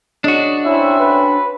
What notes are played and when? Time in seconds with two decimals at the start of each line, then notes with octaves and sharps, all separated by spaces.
0.24 C#3 D4 F#4 D#5
0.66 C4 C#4 E4 A4 E5
0.99 B4